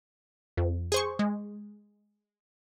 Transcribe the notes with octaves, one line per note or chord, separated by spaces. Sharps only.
F2
G#4 C5 C#6
G#3